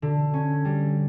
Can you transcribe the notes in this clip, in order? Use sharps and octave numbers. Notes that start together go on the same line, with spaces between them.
D3
C#4
G3